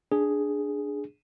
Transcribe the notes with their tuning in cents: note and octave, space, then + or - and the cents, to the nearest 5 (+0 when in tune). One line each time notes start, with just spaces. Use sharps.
D4 +0 G#4 +0